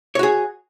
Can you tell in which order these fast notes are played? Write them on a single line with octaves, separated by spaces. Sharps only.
C#5 F#4 G#4